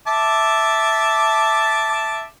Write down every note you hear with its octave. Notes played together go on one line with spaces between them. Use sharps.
E5 A5 D6